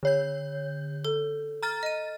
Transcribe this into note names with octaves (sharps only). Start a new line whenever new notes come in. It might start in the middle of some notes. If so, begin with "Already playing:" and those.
D3 C#5 G6
A4
A#5 F6 A6
D#5 D#7